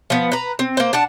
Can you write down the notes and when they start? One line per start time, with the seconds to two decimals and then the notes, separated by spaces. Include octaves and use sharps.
0.10 F3 B3
0.32 B4 A#5
0.59 C4
0.77 A#3 C5
0.93 D4 F#5 A5